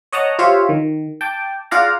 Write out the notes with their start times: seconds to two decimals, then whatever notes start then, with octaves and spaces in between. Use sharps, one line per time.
0.12 C#5 D#5 F#5 A5 A#5
0.39 F4 G4 C5 C#5 E5 F5
0.69 D#3
1.21 G5 A5 D6
1.71 F4 G#4 D5 F5 F#5 A#5